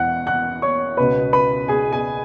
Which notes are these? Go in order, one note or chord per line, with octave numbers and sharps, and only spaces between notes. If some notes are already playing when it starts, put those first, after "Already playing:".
Already playing: E1 E2 E3 F#5 F#6
F#5 F#6
C#5 C#6
C#2 B2 B3 B4 B5
B4 B5
G#4 G#5
G#4 G#5